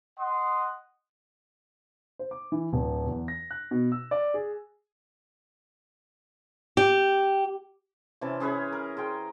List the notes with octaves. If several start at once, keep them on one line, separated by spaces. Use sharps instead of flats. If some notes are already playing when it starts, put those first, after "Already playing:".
D#5 F#5 C6 D#6
C5
D6
E3
D1
E2
A#6
F#6
B2
E6
D5
G#4
G4
C3 E3 C#4 A5
C#4 G#4 B4 C#5
A#4
G#4 C5 G5